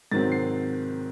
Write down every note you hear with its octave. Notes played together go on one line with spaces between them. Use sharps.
G#2 D#3 F#3 C4 A6
C7